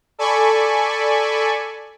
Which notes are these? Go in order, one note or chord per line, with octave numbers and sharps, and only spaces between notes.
A4 D5 G#5 B5 C#6